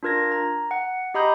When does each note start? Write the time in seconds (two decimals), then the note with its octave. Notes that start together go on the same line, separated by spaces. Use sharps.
0.03 D4 F4 A#4 G#6 A#6
0.32 A#5
0.71 F#5
1.14 G4 D#5 A#5 B5 D#6 G6